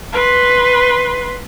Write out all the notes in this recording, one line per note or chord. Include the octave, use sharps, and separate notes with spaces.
B4 C6